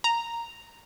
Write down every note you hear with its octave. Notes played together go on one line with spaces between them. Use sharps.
A#5